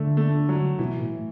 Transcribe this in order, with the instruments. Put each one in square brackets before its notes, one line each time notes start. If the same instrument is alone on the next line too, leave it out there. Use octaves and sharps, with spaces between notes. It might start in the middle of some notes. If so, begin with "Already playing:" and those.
Already playing: [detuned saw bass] D3 [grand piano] A3
[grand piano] A3
F#3
[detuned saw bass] B2 [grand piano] E3
[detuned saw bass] A2